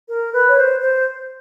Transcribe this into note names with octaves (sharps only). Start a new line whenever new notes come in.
A#4
B4
C#5
C5
C5